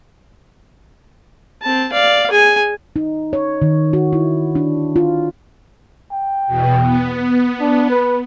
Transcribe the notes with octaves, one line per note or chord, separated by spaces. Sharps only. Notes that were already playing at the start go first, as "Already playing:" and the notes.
C4 A5
D5 F5
G#4 G#5
D#4
C#5
D#3
F#4
E4
D4
F4
G5
E2 B2
B3
D4
B4